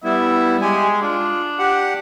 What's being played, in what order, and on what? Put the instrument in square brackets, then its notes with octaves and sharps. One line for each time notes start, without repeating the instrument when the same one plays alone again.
[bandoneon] G3 B3 E4 [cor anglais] E5
[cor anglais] G#3 [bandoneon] G4 G#5
[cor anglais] D4 [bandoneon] F4
[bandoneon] G4 F#5